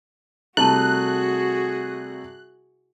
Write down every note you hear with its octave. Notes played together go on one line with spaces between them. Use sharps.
C3 G3 A3 E4 F#4 G#4 A5 F#6